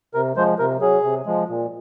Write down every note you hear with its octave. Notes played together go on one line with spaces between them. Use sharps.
C3 A#4
F3 G#3 C5
C3 A#4
F#3 G#4
C3
F3 G#3
A#2